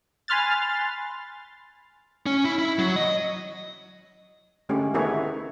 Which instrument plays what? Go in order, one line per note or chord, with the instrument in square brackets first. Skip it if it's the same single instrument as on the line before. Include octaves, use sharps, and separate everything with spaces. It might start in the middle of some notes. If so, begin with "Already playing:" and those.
[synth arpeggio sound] G#5 B5 C6 F6 F#6 A6
[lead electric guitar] C#4
E4
E4
F#3
D#5
[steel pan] D3 G#3 A3 C#4 G4
D#3 A3 B3 E4 G#4 C#5